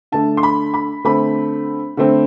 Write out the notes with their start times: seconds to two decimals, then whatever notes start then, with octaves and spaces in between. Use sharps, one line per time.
0.12 D3 A3 D4 A5
0.37 C6
0.43 B5
0.74 B5
1.04 D3 A3 C4 B5
1.97 D3 A3 C4